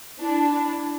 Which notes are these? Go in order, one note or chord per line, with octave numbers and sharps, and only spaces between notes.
D4 E4